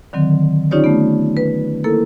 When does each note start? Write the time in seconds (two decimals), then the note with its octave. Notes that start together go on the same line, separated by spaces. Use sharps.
0.13 D3 D#3 F#3 C4
0.71 C#4 D#4 F4 G4 C#5 D5
0.84 A3 B3
1.37 B4
1.84 A#3 E4 A4 A#4